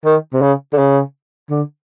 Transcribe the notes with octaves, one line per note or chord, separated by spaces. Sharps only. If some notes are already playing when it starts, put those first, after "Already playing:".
D#3
C3
C#3
D3
C#3
D3